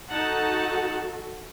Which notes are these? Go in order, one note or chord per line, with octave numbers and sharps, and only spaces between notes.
D#4 F#4 A4 F#5 A5